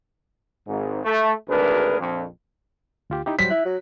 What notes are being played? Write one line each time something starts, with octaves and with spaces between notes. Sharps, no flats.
G#1 G#2
A3
G#1 D2 D4 G#4 A#4 B4
A#1 F2
D2 F4 G4
D#4 E4 G4
F#3 G3 C5 B6
E4 F#6
F#3